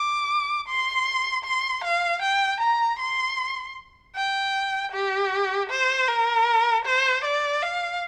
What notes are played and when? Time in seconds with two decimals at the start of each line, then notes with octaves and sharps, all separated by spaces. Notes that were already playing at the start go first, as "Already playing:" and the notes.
Already playing: D6
0.68 C6
1.44 C6
1.84 F5
2.22 G5
2.60 A#5
2.99 C6
4.15 G5
4.92 G4
5.70 C5
6.08 A#4
6.85 C5
7.24 D5
7.62 F5